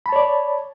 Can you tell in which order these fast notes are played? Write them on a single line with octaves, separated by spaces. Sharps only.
B5 A5 C#5 D5